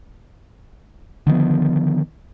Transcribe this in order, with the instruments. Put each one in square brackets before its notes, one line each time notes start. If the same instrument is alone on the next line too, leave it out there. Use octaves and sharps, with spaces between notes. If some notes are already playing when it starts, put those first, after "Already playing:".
[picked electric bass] D3 D#3 F3 B3